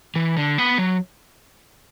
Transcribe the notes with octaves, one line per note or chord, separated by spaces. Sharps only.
E3
D3
B3
F#3